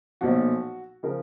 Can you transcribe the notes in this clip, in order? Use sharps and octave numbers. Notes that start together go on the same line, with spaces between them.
B1 A#2 F3 F#4
C#3 F3 A#4